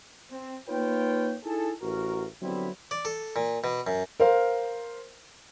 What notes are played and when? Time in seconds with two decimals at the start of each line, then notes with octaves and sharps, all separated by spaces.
0.31 C4
0.69 A#3 D#4 F4 B4 C#5 G5
1.44 D#4 E4 G#4 A4
1.82 A1 F#4 A#4
2.42 D3 F#3 G3 B3 C4 E4
2.91 D5
3.05 A4
3.36 A#2
3.64 B2
3.87 F#2
4.20 A#4 C5 F5